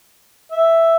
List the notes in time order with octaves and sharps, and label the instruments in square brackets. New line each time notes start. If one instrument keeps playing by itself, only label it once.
[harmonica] E5